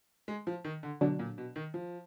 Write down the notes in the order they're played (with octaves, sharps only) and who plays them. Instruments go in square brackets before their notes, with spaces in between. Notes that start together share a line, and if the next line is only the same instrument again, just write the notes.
[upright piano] G#3
F3
D#3
D3
[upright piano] B2 [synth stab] D3 F#3 D4
[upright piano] A#2
B2
D#3
F3